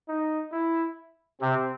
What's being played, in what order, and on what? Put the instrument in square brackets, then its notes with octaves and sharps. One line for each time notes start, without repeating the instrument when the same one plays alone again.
[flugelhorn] D#4
E4
[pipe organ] C3 [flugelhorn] C4